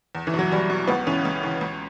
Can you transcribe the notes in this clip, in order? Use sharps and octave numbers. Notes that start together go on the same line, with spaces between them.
E2
E3
B2
F#3
E2 G3
B2
C#2 B3
C#3 E3 C#4
C#2
C#3 E3
C#2